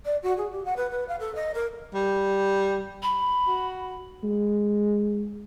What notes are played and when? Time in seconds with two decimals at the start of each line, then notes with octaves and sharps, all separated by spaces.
0.05 D5
0.23 F#4
0.37 G#4
0.51 G4
0.65 F#5
0.76 B4
0.90 B4
1.08 F5
1.19 A4
1.35 D#5
1.54 A#4
1.94 G3
3.02 B5
3.47 F#4
4.24 G#3